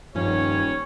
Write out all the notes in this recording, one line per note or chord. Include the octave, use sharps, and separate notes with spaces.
D#1 G2 F3 G3 C#4 C#5